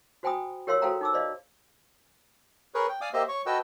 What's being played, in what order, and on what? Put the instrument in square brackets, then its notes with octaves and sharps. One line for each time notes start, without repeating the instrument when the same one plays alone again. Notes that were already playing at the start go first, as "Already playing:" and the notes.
[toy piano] F#4 C5 G5 G#5 B5 D#6
G4 A#4 C#5 F5 C6 E6
F#4 A4 C5 F5 G5 A#5
D#4 D6 E6
C5 D5 D#5 F5
[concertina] G#4 A#4 B4 C#5
G5
D5 F5 G#5 D6 D#6
A#3 G4 C5 D#5 E5
C#5 C#6
F#4 A4 B4 D#5 G5 E6